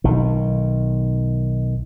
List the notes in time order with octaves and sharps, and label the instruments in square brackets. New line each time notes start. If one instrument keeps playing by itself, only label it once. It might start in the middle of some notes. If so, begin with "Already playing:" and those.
[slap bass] B1 D#3